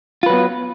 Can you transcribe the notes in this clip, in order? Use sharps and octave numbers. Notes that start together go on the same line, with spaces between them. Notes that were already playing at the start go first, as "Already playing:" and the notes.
F#3 B3 F4 B4